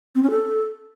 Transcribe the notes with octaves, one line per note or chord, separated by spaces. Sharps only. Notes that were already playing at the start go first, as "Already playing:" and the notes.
C4
C#4
A4